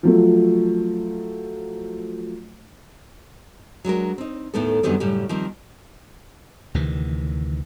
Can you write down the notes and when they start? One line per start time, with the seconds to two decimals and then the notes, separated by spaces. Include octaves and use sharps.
0.03 F3 F#3 A3
3.85 F#3 G#3 D4 A#4
4.18 C4 D#4
4.54 D#2 A2 D#3 A3 B3 A4
4.83 F#2 D3 D#3 G3 B3 C4
5.00 F#2 A2 C#3 G3
5.29 D#3 F3 G3 A#3 C4
6.75 D2 C3 D#3 E3